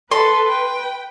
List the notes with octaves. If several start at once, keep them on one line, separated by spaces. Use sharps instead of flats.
A4 B4 C6
G5